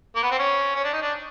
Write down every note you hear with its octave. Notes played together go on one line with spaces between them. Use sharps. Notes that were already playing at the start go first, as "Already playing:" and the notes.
A#3
B3
C4
C#4
C#4
D4
D#4
D4